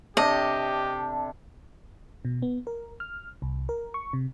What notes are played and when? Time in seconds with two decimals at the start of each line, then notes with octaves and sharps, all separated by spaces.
0.17 C3 D4 G4 A4 D#5
2.25 B2
2.42 B3
2.67 A#4
3.00 F6
3.42 C2
3.69 A#4
3.94 C#6
4.13 C3